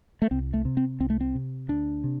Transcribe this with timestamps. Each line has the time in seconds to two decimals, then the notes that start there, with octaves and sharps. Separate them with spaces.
0.22 A3
0.31 C2 C4
0.54 A3
0.65 C3
0.77 C4
1.00 C2 C4
1.10 A3
1.21 C4
1.35 C3
1.68 D2 D4
2.04 C3